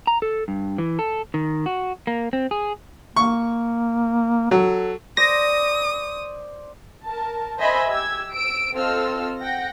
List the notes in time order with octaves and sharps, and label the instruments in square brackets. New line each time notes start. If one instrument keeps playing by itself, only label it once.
[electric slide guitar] A#5
A4
G2
E3
A4
D#3
F#4
A#3
C4
G#4
[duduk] A#3 [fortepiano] C#6
[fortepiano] F#3 [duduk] A4
[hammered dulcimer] C5 D5 [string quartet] D#6 [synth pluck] A#6
[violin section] A#4 A5
C5 D#5 E5 G#5 B5 C6
G4 E6 G#6
E6 D7
C4 F4 A4 D#5 E6 F6
F#5 G5 A#6